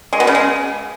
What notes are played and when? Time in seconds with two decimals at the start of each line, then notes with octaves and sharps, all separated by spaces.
0.13 G#3
0.20 B2
0.27 C#3
0.35 G#3